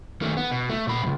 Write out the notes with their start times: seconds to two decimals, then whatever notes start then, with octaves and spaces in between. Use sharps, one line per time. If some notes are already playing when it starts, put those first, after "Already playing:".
0.21 D#3 A3
0.37 B3
0.51 B2
0.69 A3
0.87 A#2 B5
1.03 C#2 G2